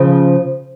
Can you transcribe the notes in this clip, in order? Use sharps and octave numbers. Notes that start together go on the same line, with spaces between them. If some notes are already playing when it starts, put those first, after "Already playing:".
Already playing: C#3 F3